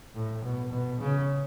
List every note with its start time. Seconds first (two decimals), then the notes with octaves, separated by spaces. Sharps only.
0.15 A2
0.43 B2
0.72 B2
1.00 C#3